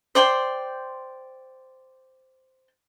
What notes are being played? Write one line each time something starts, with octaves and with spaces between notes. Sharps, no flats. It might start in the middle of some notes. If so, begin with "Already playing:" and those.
C5 D5 G5 C6